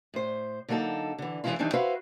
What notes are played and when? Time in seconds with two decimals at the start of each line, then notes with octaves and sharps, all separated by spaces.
0.14 A2 C5
0.68 D3 F#3 A#3 D#4 A4
1.18 D3 E3
1.44 F#2 E3 F#3 G#3 E4 F4
1.59 D#3 E3 G3 C4 D4 D#4
1.73 E4 F#4 B4 C5 E5 F5